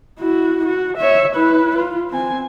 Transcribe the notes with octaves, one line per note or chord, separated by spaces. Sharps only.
E4 F#4
F#4
C#5 E5
E4 B4
F4
C4 G#5